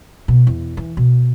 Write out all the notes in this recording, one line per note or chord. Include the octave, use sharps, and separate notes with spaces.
B2
E2
E3
B2